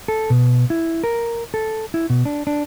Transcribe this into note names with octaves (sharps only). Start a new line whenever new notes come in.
A4
B2
E4
A#4
A4
E4
B2
D4
D4